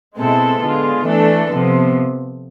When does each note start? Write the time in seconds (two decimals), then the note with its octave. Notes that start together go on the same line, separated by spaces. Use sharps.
0.17 B2 G#3 C4 E4 A4
0.62 D3 G#3 B3 F4
1.05 E3 A3 D4 A4
1.50 C3 F3 B3